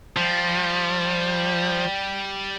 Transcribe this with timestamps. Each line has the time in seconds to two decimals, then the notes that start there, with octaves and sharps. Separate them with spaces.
0.16 F3 G3